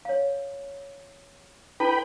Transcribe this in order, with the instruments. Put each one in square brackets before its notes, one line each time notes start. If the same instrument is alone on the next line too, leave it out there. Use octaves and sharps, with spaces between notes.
[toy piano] C#5 F5
[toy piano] E4 A4 [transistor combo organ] B4 G5 B5